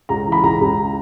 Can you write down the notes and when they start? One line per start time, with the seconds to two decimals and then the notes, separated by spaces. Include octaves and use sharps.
0.09 C#2 A#5
0.27 E3
0.32 B5
0.43 C#2 A#5
0.61 C#2